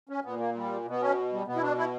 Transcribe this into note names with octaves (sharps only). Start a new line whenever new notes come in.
C#4
A#2 B3
A#3
G3
B2 B3
C#4
G3
B2 B3
E4
D4
E4